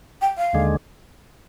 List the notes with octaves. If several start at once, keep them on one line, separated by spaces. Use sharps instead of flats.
G5
F5
D#2 D3 G#3